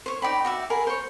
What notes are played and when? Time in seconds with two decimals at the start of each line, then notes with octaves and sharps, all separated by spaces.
0.06 C5 C#5
0.22 D#4 D5 G5 B5
0.45 F#4 D5 E5
0.70 G#4 A#4 B5
0.87 C5 C#5